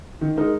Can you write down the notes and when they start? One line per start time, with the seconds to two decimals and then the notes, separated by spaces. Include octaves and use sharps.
0.21 D#3
0.36 G#3 D#4 A#4